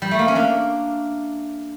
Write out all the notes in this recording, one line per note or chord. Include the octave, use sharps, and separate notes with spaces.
G3
A3
A#3
C#4
A#3 D4